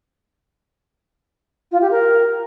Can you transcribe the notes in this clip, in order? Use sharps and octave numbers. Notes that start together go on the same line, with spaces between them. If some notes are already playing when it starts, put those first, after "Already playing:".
F4
G4
A#4